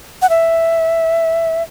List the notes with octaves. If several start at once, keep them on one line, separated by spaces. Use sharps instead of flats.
F#5
E5